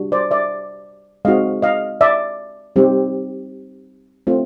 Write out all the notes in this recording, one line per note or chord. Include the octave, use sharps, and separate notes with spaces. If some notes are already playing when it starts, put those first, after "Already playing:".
Already playing: G3 D4 F#4
C5 D5
D5 E5
G#3 C4 D#4 F#4 D#5 F5
D#5 F5
D5 E5
G3 C4 D#4 G4
A3 C4 F4